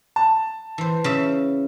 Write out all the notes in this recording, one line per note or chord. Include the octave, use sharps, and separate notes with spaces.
A5
E3 C5
C#3 E5